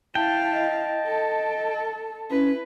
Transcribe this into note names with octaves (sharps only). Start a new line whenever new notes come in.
E4 F5 G5 A5
D#5
A4
C#4 E4 B4